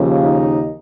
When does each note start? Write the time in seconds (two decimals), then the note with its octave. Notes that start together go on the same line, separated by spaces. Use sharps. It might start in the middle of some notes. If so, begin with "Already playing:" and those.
Already playing: D#2 C#3 F3
0.23 D#4